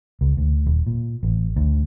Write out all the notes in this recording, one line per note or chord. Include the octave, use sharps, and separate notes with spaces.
C#2
D2
D#1
A#2
A1
D2